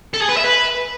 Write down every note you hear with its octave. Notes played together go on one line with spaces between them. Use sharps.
A4
G#4
B4
E5
B4